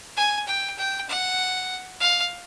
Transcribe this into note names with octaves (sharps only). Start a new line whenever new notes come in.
G#5
G5
G5
F#5
F5